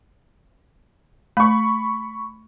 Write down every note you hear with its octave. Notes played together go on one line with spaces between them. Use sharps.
A3 B5 C#6